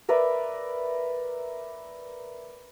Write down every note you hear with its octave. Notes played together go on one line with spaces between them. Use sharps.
A#4 B4 D5 E5